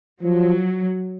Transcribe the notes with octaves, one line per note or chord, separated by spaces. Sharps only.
F3 F#3